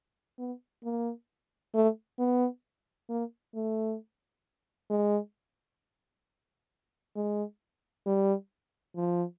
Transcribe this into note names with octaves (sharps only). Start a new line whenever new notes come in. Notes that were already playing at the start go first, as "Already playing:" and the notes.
B3
A#3
A3
B3
A#3
A3
G#3
G#3
G3
F3